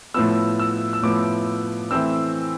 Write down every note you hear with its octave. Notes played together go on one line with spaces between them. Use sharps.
A2 F3 B3 E6
E6
E6
A2 F3 B3 D6
E3 A3 C4 E6